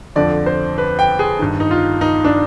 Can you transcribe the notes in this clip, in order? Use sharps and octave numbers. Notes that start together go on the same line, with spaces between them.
F2 D3 F3 D5
C5
B4
G5
G#4
G2 D#3
D#4
F4
D#4
D4